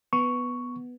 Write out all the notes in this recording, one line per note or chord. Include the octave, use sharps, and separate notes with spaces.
B3 C#6